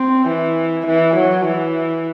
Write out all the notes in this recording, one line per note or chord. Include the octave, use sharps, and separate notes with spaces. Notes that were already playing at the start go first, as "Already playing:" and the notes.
Already playing: C4
E3
E3
F#3
E3